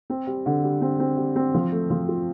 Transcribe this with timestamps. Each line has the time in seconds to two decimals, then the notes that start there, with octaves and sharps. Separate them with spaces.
0.10 C4
0.27 G3
0.46 D3
0.64 G3
0.82 C4
1.00 C4
1.17 G3
1.36 C4
1.54 F3
1.72 A3
1.90 F3
2.09 F4